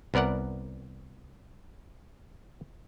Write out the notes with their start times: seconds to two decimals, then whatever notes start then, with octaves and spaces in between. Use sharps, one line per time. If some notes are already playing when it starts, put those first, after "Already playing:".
0.14 C2 B3 A#4 D5 F#5